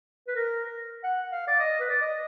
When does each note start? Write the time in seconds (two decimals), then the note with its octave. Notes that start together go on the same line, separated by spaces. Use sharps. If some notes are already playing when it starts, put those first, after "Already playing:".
0.27 B4
0.35 A#4
1.04 F#5
1.32 F5
1.48 D5
1.59 D#5
1.80 B4
1.90 D5
2.01 D#5